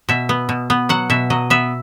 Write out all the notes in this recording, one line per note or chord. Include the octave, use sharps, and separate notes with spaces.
B2 E5
B3
B2
B3
F#3 F#5
B2 E5
F#3 D#5
B3 E5